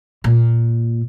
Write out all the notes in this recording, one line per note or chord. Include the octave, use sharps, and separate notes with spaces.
A#2